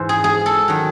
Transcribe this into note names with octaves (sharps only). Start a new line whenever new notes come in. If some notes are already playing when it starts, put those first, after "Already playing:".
Already playing: G#2 E3 C5
G#4
G#4
A4
D#3 F#3